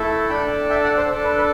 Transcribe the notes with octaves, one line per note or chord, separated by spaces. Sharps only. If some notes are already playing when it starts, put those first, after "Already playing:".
Already playing: A3 E4 A4
D4 A4 G5 B5
E5 G5
D5 F#5
A4 C5
D4 A4
B4
B4